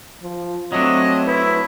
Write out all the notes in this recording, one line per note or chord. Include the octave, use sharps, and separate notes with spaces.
F3
F#3 A3 C4 D4 D#5
E4 B4